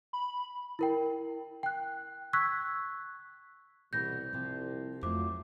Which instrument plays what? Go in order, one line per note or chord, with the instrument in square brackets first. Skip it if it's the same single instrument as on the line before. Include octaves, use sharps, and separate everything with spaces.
[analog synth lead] B5
[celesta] E4 A#4 G5
G5 F#6
C#6 E6 F#6 G#6 B6
[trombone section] C2 [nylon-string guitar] B2 E3 B3 [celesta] G6 A#6
[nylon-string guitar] C3 F3
[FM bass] F2 [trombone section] F3 F#3 [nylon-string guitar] A3 E4 C5 [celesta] D6